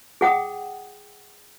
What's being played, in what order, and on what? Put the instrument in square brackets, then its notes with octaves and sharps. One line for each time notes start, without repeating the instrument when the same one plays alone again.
[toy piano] G#4 F#5 G5 D#6